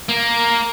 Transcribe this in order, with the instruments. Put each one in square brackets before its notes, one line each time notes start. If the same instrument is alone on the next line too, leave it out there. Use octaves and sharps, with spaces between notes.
[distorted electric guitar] A#3